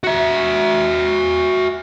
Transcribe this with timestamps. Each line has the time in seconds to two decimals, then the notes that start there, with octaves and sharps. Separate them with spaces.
0.04 F#4 E5